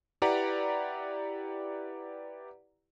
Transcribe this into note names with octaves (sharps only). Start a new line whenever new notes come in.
E4 G4 B4 D5 F#5 A#5